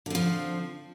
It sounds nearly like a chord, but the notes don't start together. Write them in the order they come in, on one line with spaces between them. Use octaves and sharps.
D3 C4 F3